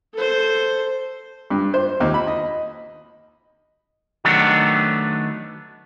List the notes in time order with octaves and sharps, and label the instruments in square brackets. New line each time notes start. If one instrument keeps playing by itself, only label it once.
[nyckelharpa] A4 C5
[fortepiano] G2
C5
D#2
B5
D#5
[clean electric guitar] D#3 F#3 A3 B3 D4